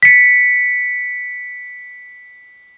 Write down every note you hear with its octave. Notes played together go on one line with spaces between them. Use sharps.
B6 C#7